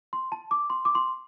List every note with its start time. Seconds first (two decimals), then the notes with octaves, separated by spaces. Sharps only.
0.13 C6
0.32 A5
0.51 D6
0.70 C6
0.85 D6
0.95 C6